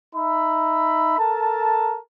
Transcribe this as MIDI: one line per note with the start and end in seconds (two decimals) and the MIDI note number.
0.16 1.18 63
0.16 1.18 76
0.16 1.18 83
1.19 1.99 69
1.19 1.99 70
1.19 1.99 81